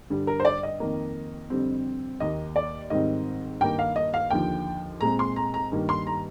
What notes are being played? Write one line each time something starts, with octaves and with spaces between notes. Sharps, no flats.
G2 D3 G3
A#4
C5
D5
D#5
F2 D#3 A#3
F2 D3 G3 C4
D#2 D#3 A#3 D#5
D5
G#2 D#3 G3 C4 D#5
G2 D#3 A#3 G5
F5
D#5
F5
D#2 D3 F3 G5
A#2 G#3 C4 A#5
C6
A#5
A#5
G2 D#3 G3 A#3
C6
A#5